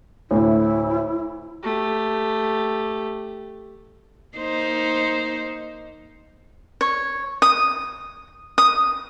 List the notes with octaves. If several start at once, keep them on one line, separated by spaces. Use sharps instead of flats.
D2 A2 E4
A3 G4
A#3 D#4 C5
C#5
D#6
D#6